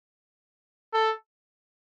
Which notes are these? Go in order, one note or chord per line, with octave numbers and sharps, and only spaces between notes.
A4